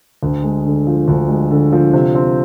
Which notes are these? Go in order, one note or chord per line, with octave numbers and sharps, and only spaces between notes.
D2
G#3
D3
F3
D2
G#3
D3
F3
C3
C4